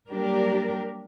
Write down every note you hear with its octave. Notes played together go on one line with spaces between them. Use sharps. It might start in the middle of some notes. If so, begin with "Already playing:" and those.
F#3 G3 A#3 D4 G4 A#4